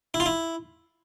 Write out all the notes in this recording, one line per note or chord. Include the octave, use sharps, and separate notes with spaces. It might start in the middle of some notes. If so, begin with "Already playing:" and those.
E4
F4
E4